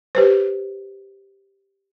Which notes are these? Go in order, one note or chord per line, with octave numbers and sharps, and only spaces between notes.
G4 B4 C5